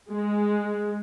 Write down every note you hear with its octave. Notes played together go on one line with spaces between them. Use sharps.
G#3